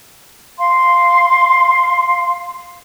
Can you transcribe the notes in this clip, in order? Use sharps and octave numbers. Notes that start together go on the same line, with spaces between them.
F5 C6